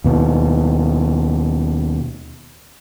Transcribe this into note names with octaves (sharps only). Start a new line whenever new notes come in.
D#2 B2